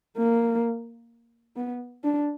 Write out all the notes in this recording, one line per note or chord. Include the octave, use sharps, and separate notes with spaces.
A#3
B3
D4